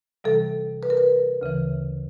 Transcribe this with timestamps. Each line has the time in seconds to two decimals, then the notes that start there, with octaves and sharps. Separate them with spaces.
0.24 C3 E3 G3 A4
0.83 B4
0.90 A#4
0.97 B4
1.41 D2 C#3 E3